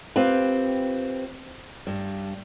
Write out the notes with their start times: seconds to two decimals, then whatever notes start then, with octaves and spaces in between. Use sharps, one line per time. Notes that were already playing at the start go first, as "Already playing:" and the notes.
0.16 C4 F4 G4 B4
1.87 G2